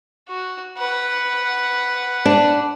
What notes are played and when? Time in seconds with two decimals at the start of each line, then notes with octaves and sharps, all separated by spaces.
0.29 F#4
0.77 B4 F#5
2.26 D4